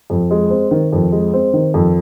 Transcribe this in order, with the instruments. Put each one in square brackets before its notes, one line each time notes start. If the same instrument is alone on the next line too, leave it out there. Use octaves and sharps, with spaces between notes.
[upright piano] F2
G#3
C4
D#3
F2
G#3
C4
D#3
F2